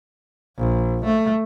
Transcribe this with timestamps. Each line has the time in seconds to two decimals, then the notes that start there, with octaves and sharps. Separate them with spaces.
0.58 A#1
1.05 A3